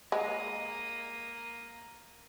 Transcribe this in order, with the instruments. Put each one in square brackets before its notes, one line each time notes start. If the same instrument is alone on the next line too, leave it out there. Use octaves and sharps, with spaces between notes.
[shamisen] G#3 [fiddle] A#3 D#6